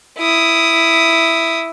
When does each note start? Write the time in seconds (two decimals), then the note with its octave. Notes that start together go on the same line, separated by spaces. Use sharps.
0.19 E4 D#6